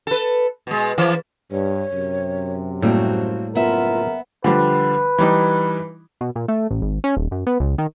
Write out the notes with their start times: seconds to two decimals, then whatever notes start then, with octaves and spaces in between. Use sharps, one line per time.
0.07 A4 B4
0.67 B2 G#3
0.98 E3
1.52 G2 C#5
1.92 F#2 C3
2.82 A2 G3 A#3 C4 F#4 A4
3.55 F#1 B3 F4 A#4 E5
4.44 D3 F3 G3 B4
5.18 E3 G3 D#4
6.21 B2
6.36 A#2
6.48 A3
6.70 A1
6.82 G#1
7.04 C#4
7.17 D#1
7.31 F#2
7.47 B3
7.60 C#2
7.78 D#3